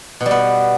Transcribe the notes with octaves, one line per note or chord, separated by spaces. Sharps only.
B2
G3
B3